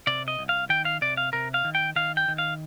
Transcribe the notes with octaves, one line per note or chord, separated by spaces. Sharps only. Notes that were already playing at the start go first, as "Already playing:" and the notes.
C3 D5
D#5
C2
F5
D#3 G5
F5
C3 D5
F5
C3 A#4
F5
D#3
G5
D#3 F5
G5
D#3
F5